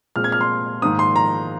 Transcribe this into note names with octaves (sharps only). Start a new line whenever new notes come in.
A#2 G#3 C4 F6
G#6
F6
C6
G#2 D#3 A#3 D#6
C6
A#5